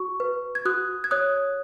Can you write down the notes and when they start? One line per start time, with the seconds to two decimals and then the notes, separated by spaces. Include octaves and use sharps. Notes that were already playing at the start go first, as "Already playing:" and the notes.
Already playing: F#4 C#6
0.20 B4
0.55 G#6
0.65 F#4 D#6 F#6
1.04 G#6
1.11 C#5 D#6 F#6